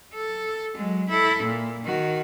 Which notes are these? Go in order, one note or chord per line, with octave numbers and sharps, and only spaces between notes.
A4
F#3 G#3
E4 A4
A#2
D#3 F#4